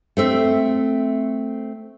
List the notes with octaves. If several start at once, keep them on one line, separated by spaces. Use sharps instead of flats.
A3 C4 E5